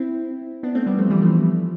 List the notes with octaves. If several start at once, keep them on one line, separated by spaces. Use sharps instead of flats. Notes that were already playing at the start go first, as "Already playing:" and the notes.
Already playing: C4 E4
B3 D4
A3 C4
G3 B3
F3 A3
E3 G3
F3 A3